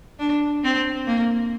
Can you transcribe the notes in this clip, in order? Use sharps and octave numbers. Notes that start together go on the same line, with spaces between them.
D4
C4
A#3